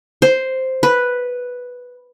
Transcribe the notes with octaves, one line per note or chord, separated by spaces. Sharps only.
C5
B4